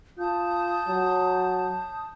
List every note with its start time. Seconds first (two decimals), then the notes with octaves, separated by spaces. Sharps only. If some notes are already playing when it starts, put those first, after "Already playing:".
0.19 F4 A5 D#6 G6
0.88 F#3